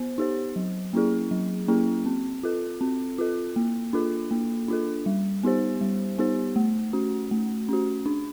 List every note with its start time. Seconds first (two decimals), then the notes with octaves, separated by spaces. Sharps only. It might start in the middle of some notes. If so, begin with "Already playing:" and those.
Already playing: B3 C5
0.18 D#4 G4 C5
0.56 F#3
0.93 A#3 C#4 E4 G#4
1.31 F#3
1.68 A#3 C#4 E4 G#4
2.06 C4
2.43 F4 A4
2.81 C4
3.18 F4 A4
3.56 A#3
3.93 D4 F4 A4
4.31 A#3
4.68 D4 F4 A4
5.06 G3
5.43 B3 D#4 G4 C5
5.81 G3
6.18 B3 D#4 G4 C5
6.56 A3
6.93 C#4 F#4
7.31 A3
7.69 C#4 F#4
8.06 D4